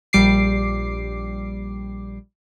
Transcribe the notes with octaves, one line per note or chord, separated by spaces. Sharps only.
A#1 G3 D6 C7